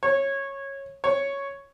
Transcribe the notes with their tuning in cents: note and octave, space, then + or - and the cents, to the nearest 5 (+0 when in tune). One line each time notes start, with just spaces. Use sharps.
C#5 -15
C#5 +0